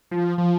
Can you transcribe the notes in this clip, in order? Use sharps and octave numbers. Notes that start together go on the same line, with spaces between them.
F3
F3